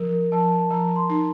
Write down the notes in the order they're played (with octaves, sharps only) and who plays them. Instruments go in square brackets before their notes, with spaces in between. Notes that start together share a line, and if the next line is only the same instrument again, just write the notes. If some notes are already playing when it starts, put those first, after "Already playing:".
Already playing: [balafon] F3 [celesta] A#4
[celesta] A#4
[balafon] F3 [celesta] A5
[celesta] A5
[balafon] F3 [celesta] A#5
[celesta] C6
[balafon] D#4